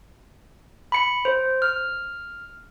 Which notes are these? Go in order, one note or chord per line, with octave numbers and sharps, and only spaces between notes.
B5 C#7
C5
F6